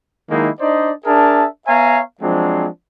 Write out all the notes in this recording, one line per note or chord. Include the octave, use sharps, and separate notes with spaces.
D#3 F#3 G#3 A#3 D#4 E4
D4 D#4 C5 D5 D#5
D4 G#4 A#4 E5 A5
B3 C#5 E5 F5 G#5 A#5
F3 F#3 G#3 C4 D4